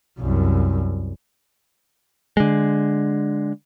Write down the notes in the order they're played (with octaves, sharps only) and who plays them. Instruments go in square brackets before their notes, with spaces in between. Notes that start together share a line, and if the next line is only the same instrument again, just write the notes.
[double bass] C2 F#2
[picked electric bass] D3 G#3